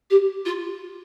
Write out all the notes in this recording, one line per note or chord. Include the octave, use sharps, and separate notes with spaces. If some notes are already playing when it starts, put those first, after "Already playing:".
G4
F4